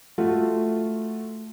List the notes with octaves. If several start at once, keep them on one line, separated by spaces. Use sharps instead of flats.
A3 F4 F#4